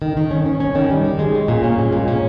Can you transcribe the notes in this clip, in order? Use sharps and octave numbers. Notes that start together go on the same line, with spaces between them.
D#3
D#3
C#4
C#4
C#4
D#3
G3
D#3
G#3
C#4
A#2
C#4
G#3
A#2
C#4